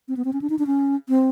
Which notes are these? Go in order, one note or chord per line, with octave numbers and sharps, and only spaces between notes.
C4
B3
C4
C#4
D4
D#4
D4
C#4
C4